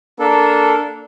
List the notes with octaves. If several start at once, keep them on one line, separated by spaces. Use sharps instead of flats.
A#3 D4 A4